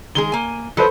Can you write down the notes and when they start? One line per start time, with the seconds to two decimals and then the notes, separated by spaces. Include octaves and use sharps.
0.15 D#3 G#3 G#4 G7
0.32 A#3 G#5
0.77 F3 F#3 A4 B4 C5